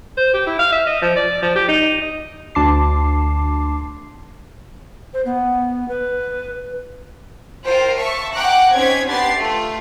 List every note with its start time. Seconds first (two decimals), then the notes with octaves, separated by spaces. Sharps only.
0.17 C5
0.33 G4
0.47 E4
0.59 F5
0.72 E5
0.87 D#5
1.02 F3
1.16 D5
1.42 F3
1.56 G4
1.68 D#4
2.02 D#5
2.55 D2 D4 A5 C6 D6 C7
5.14 C5
5.25 B3
5.88 B4
7.67 F4 A#4 C5 G5
7.98 E5 A5 C#6
8.33 F#5 G5 A#5 D6 F#6
8.74 C4 C#4 D#4 C5 G#6 B6
9.08 B3 D4 G4 C6 A6 C7
9.37 A3 F4